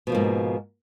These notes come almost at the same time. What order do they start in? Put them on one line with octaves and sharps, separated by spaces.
B2 F3 A#3 G#2